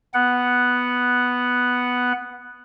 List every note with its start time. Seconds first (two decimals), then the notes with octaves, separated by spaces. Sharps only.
0.14 B3 F#5